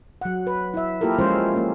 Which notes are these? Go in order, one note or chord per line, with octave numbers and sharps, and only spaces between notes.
F#3 F#5
B4
E4 E5
A#3 E4 F4 G4 A4 A#4
F3 G#3 C#4 F4 C5
A#3 C#4